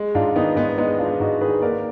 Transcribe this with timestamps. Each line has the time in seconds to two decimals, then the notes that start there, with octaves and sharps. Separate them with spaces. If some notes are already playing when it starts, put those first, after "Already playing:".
Already playing: G#3
0.15 G#2 D4 F4
0.36 D#3 B3 D#4
0.56 G#2 B3 D#4
0.77 G#3 B3 D#4
0.98 G#3 D4 F4
1.20 G#2 D#4 F#4
1.41 D#3 G#4 B4
1.62 A#3 A#4 D5